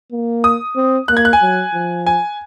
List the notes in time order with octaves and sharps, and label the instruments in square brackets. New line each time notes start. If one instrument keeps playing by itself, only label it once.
[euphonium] A#3
[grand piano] D#6
[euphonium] C4
[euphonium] A#3 [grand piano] F#6
[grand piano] G#6
F#6
G#5
[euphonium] F#3
F3
[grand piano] G#5